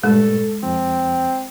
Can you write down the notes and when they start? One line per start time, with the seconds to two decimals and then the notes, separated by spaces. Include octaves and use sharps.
0.04 G2 A#2 G#3 A3 A4
0.63 F2 F3 C4